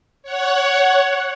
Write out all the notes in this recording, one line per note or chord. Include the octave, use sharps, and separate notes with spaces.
C#5 F#5